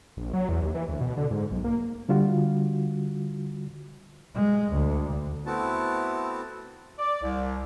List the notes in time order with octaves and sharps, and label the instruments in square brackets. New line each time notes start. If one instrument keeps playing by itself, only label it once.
[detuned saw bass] A#1
F#3
E2
D#2
E3
D2
B2
D3
G#2
B1
A#3
[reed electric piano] D3 G3 F4 F#4
[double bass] G#3
D2
[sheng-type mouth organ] A3 B3 C4 E4 F#4 A5
[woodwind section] D5
C2